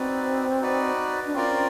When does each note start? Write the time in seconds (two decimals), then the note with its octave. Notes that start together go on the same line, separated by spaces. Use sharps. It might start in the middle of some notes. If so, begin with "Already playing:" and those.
Already playing: C4 D#4 F#4 B4 D5
0.61 D#4 F#4 B4 D5
1.26 D4
1.34 C4 C#4 F4 A#4 D5